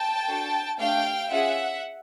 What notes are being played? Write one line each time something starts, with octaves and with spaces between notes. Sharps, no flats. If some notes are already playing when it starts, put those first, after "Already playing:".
Already playing: G5 A5
D4 F#4 A4
A3 D4 G4 F5 G5
C#4 F4 G#4 E5 F#5